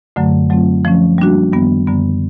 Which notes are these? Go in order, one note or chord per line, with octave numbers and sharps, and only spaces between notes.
F#2 D3 F#3 A3
F#3 A3 C4 F4
F3 A3 C#4
G3 A#3 D4 F#4
F#2 D#3 G3 B3
F#2 D3 G3 B3